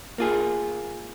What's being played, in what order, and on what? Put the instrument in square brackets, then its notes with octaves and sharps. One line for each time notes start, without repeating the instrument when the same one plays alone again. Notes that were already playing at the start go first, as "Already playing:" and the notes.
[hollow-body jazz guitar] A#3 F4 G#4